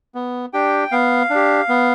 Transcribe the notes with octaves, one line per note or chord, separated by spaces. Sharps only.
B3
D4 G4 G5
B3 F5
D4
G4
B3